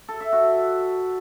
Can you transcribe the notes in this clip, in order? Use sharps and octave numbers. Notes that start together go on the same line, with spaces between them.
A4
E5
F#4